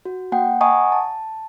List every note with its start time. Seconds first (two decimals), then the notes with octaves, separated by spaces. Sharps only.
0.05 F#4
0.32 A#3 F#5 G5
0.61 D#5 F#5 G#5 A#5 C#6 D#6
0.92 A5